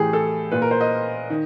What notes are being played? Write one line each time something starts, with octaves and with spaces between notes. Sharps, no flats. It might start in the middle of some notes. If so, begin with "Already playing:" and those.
Already playing: A2 E3 G4 G#4
A4
A#2 B4
A#4
C5
D#5
D#3